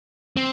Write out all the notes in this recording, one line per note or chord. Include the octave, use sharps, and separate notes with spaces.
C4